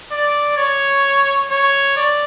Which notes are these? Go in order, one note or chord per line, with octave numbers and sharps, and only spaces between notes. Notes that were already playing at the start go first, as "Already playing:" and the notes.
D5
C#5
C#5
D5